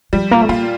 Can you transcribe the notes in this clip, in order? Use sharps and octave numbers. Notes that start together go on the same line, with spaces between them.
F3 G3
A#2 A#3
A3
A#3 F4